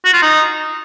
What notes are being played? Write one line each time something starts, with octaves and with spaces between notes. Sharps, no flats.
F#4
F4
D#4